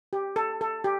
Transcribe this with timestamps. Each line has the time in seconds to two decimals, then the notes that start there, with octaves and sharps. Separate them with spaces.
0.13 G4
0.36 A4
0.61 A4
0.84 G4